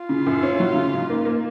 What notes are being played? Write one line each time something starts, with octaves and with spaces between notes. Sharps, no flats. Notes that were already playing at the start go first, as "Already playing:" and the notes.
Already playing: F4
C#3
F#2
C#4
F#3
C#3
G#2
A#3
A#3